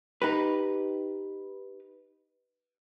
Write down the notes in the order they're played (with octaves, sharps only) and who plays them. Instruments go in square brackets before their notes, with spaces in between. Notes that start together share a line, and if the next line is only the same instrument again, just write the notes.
[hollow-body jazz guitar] D#4 G4 B4